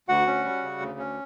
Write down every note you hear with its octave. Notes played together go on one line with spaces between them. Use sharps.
D2 F#4 F#5
C#4
G3
C#3
D2
C#4